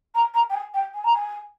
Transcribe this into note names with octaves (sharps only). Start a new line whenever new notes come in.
A#5
A#5
G5
G#5
G5
G#5
A#5
G#5